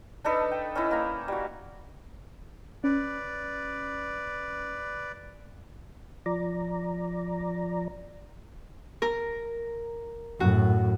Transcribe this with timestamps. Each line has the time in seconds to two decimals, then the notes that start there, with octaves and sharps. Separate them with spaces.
0.24 D4 D#4 A4 B4
0.51 G5
0.75 C#4 D#4 E4
0.91 A#3 A#5
1.28 G3 F#4
2.84 C#4 B4 D5
6.26 F3 D5 A#5
9.02 A#4
10.40 F#2 A2 F#4